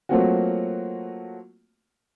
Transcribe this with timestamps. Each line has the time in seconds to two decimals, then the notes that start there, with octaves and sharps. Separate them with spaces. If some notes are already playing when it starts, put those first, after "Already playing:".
0.09 F#3 A3 A#3 C4 F4 F#4